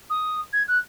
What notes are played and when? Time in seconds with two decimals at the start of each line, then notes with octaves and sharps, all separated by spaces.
0.10 D#6
0.53 G#6
0.68 F#6